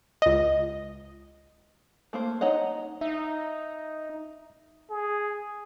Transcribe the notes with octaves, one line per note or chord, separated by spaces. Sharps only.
C#2 D#5
A3 A#3 C5
D#4 C#5 D#5 F#5
D#4 E5
G#4